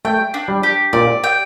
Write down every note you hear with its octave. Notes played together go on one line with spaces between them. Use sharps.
A3 G5
D4
G3
G4
A#2 D5
G5